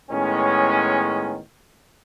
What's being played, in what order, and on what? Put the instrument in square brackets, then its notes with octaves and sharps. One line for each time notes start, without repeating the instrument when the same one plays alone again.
[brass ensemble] A2 D#3 G#3 B3 C#4